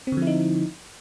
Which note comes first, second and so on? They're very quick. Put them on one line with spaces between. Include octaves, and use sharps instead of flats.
C4 D3 F3 E4 D#4